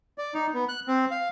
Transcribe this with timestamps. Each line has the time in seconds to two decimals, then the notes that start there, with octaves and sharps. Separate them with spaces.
0.18 D5
0.34 D#4
0.54 B3
0.69 F#6
0.88 C4
1.11 F5